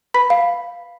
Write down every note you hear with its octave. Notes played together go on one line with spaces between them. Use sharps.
B4 B5 B6
F5